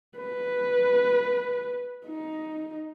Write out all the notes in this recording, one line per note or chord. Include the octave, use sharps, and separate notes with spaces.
B4
D#4